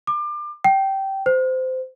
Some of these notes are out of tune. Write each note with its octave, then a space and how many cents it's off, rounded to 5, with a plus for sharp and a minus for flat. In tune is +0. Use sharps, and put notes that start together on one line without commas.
D6 +30
G5 -15
C5 -20